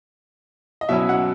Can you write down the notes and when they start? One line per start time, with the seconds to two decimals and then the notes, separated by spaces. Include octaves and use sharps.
0.81 D#5
0.89 B2 F#3 C#4 E4 E5
1.09 F#5